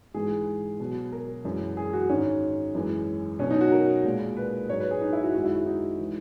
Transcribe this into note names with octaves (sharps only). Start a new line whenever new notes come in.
G#2 E3 G#3 G#4
B2 F#3
A#4
F#2 E3 G#3
G#4
F#4
G#2 D#3 G#3 C#4
F#2 E3 G#3
B2 F#3 C#4
D#4
F#4
A#4
A#2 G#3
B4
G#2 F#3 C#5
B4
G#4
D#4
E4
F#4
F#2 D#3 G#3 F#4
E4
F#4
D#4
E3 G#3